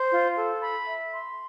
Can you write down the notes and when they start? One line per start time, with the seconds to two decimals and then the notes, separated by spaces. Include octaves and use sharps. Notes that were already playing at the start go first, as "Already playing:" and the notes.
Already playing: C5
0.10 F4
0.36 A4
0.60 B5
0.86 E5
1.12 C6